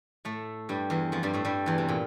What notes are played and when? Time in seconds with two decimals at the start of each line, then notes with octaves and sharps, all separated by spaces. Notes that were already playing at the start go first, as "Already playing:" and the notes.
0.25 A2 A3
0.69 G2 G3
0.90 E2 E3
1.12 F2 F3
1.23 G2 G3
1.34 A2 A3
1.45 G2 G3
1.66 E2 E3
1.78 C3
1.89 A#2